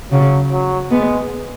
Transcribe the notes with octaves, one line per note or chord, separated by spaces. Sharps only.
C#3 F#3
F#3
G#3 B3